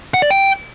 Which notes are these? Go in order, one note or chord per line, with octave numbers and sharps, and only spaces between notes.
F#5
D5
G5